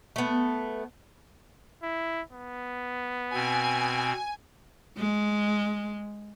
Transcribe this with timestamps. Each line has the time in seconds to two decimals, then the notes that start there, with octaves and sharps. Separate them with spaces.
0.16 A3 B3
1.82 E4
2.33 B3
3.34 B2 C4 G#5
4.98 G#3